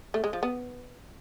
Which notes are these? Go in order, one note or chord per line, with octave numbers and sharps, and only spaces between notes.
A3
G#3
F3
B3